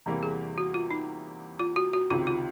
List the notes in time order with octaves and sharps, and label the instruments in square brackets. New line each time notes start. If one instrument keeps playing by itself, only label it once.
[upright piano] E2 C3 E3 G3 A#3
[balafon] G#4
F#4
F4
D#4
F4
F#4
F#4
[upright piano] C#2 C3 D#3 [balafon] F4
[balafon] F4